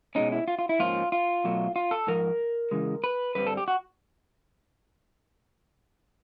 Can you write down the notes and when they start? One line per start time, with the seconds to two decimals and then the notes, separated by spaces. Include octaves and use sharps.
0.15 B2 G#3 C#4 D#4
0.32 E4
0.48 F4
0.59 F4
0.69 E4
0.79 G#2 F3 A#3 C#4 F4
1.12 F4
1.44 B2 F#3 A3
1.76 F4
1.91 A4
2.07 G#2 F3 A#4
2.71 C#3 E3 G#3
3.04 B4
3.35 G2 D3 G3 C4 B4
3.47 A4
3.57 G4
3.68 F#4